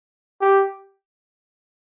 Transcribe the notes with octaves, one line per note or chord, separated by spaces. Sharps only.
G4